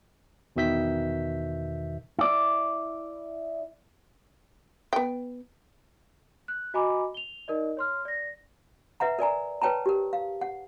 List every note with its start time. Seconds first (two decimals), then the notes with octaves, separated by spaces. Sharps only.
0.56 E2 B2 D#3 E5 G6 B6
2.19 E4 D5
4.93 B3 G5
6.48 F#6
6.74 F#4 D#5 G#5 A#5 B5 D6
7.14 F7 G7
7.48 D#4 A#4 D5 D#5
7.77 C#5 C6 F6
8.05 D5 A#6
9.00 B4 E5 F#5 A#5
9.19 A#4 D5 G#5 A#5
9.62 B4 C#5 G5 A5 A#5
9.86 G4 A#4
10.13 F5
10.41 F#5